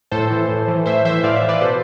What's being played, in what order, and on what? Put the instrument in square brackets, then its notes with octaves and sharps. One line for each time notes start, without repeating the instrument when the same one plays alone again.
[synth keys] A2 A4 C5
E3
A2
E3
A2 C5 E5
E3 C5 E5
A2 D5 F5
C5 E5
E3
B4 D5
B2 A4 C5